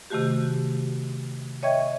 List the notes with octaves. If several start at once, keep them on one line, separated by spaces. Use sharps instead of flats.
C3 D#3 A3 F#4 G4
C#5 D#5 E5 G5 C#6 G#6